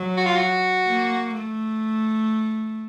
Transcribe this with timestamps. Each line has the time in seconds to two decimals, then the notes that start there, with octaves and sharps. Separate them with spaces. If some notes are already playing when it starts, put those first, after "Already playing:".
Already playing: F#3
0.17 F#4
0.26 F4
0.36 F#4
0.87 A#3
1.34 A3